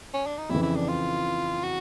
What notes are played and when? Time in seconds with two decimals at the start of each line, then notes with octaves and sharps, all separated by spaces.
0.14 C#4
0.26 D4
0.38 D#4
0.50 F2 C#3 E3 E4
0.62 E4
0.76 D4
0.88 F4
1.63 F#4